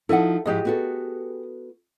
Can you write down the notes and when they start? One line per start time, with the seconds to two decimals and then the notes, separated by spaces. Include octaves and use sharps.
0.09 F3 D#4 E4 A4 F#5
0.46 G#2 F3 E4 G4 G#4 D#5
0.65 B3 F#4 A4